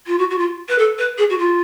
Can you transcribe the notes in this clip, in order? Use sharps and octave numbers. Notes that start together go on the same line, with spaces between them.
F4
F#4
F#4
F4
B4
A4
B4
G#4
F#4
F4